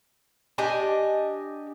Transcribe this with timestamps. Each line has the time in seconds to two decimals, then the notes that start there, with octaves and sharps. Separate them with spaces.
0.58 D4 G4 D#5 G#5